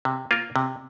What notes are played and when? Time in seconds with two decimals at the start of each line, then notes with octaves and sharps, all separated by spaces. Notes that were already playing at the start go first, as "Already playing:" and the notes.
0.05 C3
0.31 A#3 F4 A#4
0.56 C3